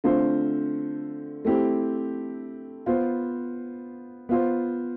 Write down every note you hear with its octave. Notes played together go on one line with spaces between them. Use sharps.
D3 A3 C4 F4 C5
A3 C4 E4 G4
B3 F4 C5
B3 F4 C5